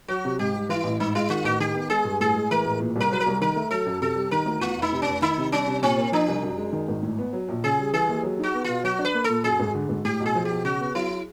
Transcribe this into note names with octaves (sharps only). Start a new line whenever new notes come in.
F#3 F#4
C3
G#2 G4
G3
E3 E4
A1
G#2 D#4
G#3 E4
D#3 F4
A1 F#4
D#3 G4
B3
G#3 G#4
G2
A2 G#4
G#3
E3 A#4
A1
A#2
C2 A#4
F#3 B4
A#4
C2
D#3 A#4
A3
F#3 A4
F#2
C3 A4
G3
D#3 A#4
D2
E2 F4
F1 D#4
C3
F1 C#4
D#3 D#4
C3
G3 C#4
C3
A#2 C4
A#3
F3 D4
C2
F#2
G#3
D#3
G#1
A2
B3
F#3
A#1
C#3 G#4
G3
E3 G#4
D#2
F#3
D#4 F#4
B3
B2 F4
F#3 F#4
D4
B4
A#3
A#2 A4
F#2 G#4
G#1
D3
G#1
A2 G4
B1
G#4
F3
G4
B1
C#3 F#4
B3
F#3 E4